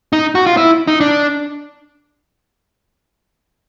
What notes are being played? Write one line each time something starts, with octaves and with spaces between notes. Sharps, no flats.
D#4
F#4
F4
E4
D#4
D4